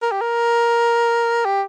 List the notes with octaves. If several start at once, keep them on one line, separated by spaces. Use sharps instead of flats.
A#4
G4
A#4
G4